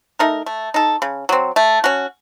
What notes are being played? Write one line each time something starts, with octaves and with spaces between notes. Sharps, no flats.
A3 D#4 A#4
A3
D#4 A4
C#3
F#3 C4
A3
C#4 F#4